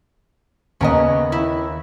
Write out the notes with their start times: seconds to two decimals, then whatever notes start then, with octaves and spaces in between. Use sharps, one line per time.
0.81 D#2 C#3 B3 D#5 A#5
1.32 E4